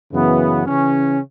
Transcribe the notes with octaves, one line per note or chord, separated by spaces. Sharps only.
F#2 C#3 E3 B3
C#3 E3 C#4